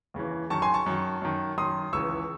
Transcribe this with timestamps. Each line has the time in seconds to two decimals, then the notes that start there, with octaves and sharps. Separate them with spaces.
0.14 D#2 C#3 E3
0.50 F#2 D#3 A5 C#6
0.62 G#5 C6
0.74 A5 C#6
0.86 F#2 D#3
1.22 F#2 D#3
1.57 F#2 D#3 C6 D#6
1.93 C#2 C#3 E3 C#6 E6